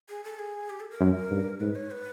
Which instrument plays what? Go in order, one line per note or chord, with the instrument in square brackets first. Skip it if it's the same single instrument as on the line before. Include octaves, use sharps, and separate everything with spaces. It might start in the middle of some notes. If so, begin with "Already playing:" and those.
[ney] G#4
A4
G#4
G4
A4
A#4
[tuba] F#2
G2
[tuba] G#2 [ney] B4
[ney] C#5
B4